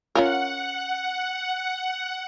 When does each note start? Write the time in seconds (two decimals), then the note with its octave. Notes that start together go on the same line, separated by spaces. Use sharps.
0.15 C#4 F4 A#4 F#5